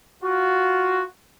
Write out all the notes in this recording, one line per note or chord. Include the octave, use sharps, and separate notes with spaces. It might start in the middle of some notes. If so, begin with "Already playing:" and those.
F4 F#4